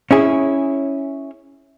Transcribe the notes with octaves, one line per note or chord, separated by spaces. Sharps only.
C#4 E4 G#4